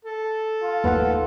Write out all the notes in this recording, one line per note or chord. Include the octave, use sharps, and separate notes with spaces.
A4
F4
D#2 A3 A#3 B4 F#5